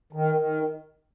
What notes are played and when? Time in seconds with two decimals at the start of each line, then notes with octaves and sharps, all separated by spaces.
0.13 D#3
0.35 D#3